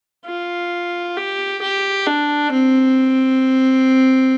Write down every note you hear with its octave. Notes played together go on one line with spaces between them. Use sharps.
F4
G4
G4
D4
C4